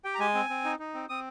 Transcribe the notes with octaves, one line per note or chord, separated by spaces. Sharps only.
G4 G5
A#5
G#3 G#5
C4
C4
D#4
D#4
C4
C4 D#6